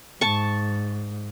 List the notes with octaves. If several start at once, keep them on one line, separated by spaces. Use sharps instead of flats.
G#2 A5 C#6